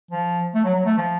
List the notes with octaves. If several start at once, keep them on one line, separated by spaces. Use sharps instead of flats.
F3
A3
F#3
F#3
A3
F3